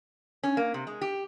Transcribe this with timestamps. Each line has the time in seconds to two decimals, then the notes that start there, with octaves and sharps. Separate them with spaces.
0.44 C#4
0.57 A#3
0.74 C3
0.87 G#3
1.02 G4